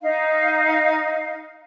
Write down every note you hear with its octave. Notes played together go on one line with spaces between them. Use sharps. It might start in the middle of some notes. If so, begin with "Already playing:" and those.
D#4 F5